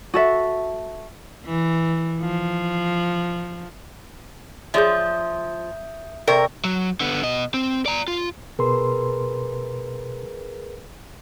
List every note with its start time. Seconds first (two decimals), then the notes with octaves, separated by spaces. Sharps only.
0.14 F#4 A4 E5
1.45 E3
2.21 F3
4.74 F3 G#4 C#5 D5 E5 D#6 G6
6.28 C3 A#4 D5 G5 C#6
6.65 F#3
7.00 D3 B3
7.23 B2 D#5
7.54 C4
7.86 D5 A#5
8.08 F4
8.59 B2 G#4 A#4 B4 C6